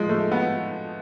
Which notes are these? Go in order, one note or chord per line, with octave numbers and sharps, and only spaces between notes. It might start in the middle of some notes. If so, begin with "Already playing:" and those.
Already playing: F3 G#3
A3
B3